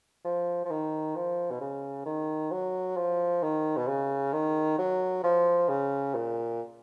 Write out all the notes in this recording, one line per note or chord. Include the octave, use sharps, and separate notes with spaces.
F3
F3
D#3
F3
B2
C#3
D#3
F#3
F3
D#3
B2
C#3
D#3
F#3
F3
C#3
A#2